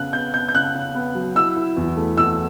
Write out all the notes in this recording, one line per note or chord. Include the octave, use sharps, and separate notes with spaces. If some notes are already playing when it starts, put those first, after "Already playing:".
Already playing: C#3 B3 F#6
B3 G6
B3 G6
G6
C#3 F#6
C#3
B3
F#3
E4 E6
E4
E2
A3
E2 E6